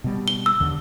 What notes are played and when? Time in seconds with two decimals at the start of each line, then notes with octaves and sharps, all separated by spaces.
0.04 B2 G3
0.28 G7
0.46 E6
0.60 D#2 D3